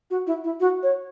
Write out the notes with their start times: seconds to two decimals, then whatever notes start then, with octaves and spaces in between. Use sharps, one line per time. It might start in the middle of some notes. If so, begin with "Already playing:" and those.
0.10 F#4
0.27 E4
0.44 E4
0.60 F#4
0.83 C#5